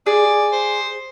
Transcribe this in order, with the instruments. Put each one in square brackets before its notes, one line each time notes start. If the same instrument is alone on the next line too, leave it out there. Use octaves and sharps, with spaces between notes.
[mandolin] G#4 [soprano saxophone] D5
[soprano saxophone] C5